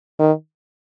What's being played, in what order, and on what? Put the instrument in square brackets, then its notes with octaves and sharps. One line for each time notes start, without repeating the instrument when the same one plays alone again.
[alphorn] D#3